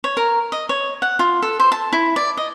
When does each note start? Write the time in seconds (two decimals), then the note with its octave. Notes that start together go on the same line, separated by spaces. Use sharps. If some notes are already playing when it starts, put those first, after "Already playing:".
0.04 C#5
0.17 A#4
0.52 D#5
0.69 C#5
1.02 F#5
1.19 F4
1.42 A4
1.60 C5
1.72 A5
1.93 E4
2.16 D5
2.37 D#5